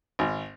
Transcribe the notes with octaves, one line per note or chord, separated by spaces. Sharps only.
G#1